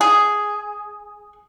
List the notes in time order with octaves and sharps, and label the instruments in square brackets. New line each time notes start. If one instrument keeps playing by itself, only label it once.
[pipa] G#4